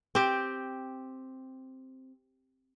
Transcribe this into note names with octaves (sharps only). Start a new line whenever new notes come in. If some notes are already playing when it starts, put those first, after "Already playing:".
C4 G4